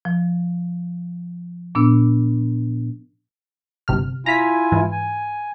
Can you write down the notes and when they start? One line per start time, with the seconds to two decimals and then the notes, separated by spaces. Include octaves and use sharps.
0.05 F3
1.75 A#2 B3 D4 E6
3.88 G1 C3 F6
4.26 E4 F4 G#5 A#5 B6
4.72 G#2 E3
4.92 G#5